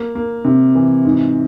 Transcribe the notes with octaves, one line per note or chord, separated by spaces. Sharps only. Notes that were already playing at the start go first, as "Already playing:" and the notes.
Already playing: A#3
A#3
C3
E3
G#2